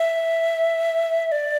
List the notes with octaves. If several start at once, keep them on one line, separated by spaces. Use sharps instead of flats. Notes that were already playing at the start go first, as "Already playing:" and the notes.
Already playing: E5
D5